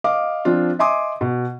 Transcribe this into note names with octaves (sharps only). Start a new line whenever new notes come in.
D#5 F5 D6
F3 C4 D4 F4
D#5 E5 G#5 C6 D6 D#6
B2